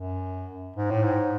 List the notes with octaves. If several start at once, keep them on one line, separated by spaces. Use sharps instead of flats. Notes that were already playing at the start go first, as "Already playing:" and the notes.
Already playing: F#2
G#2
A2
G#2